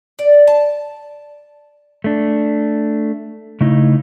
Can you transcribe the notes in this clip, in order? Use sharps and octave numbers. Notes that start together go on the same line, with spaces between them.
D5
A5
A3 D4
C#3 A3 D#4 E4